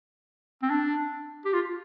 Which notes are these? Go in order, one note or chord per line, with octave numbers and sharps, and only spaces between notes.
C4
D4
G4
F4